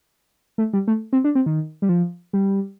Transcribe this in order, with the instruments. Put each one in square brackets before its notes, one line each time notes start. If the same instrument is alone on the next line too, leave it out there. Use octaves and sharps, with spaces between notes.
[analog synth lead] A3
G3
A3
C4
D4
C4
D#3
G3
F3
G3